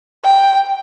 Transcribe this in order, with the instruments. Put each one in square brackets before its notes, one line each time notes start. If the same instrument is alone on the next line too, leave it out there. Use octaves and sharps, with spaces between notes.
[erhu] G5